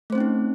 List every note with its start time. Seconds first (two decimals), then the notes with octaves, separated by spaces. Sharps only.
0.10 A3
0.13 C5
0.15 C4
0.18 C#4
0.20 D#4